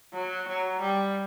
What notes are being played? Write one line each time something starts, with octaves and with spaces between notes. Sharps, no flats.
F#3
F#3
G3